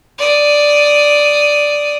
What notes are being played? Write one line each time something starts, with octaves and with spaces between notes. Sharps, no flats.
D5 D#6